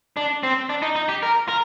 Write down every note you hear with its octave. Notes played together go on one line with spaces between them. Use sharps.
D4
C4
D4
D#4
D#4
G4
A#4
A#4